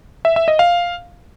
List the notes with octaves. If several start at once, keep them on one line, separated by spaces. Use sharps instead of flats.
E5
E5
D#5
F5